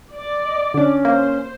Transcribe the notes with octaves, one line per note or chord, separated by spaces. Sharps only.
D5
D#5
D3 C#4 D4
A#3 C5